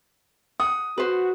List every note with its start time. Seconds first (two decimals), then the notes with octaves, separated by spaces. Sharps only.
0.60 F#5 D#6
0.98 F#4 B4 C5